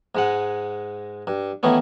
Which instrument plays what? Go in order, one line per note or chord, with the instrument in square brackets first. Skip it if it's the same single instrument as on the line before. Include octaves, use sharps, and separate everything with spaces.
[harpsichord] G#2 G#3 F#5
G2
D#3 E3 A3 B3 C#4